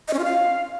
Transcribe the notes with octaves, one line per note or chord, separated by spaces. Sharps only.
D#5
C#4
F4
F5